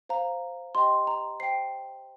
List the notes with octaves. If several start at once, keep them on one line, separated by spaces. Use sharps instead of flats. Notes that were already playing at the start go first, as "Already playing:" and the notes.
C5 F5 A#5
G4 D#5 G5 C6
A#5
C5 G5 C7